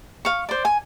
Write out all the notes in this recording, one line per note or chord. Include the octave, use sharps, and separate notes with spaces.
F5 C#6
C5 D5
G#5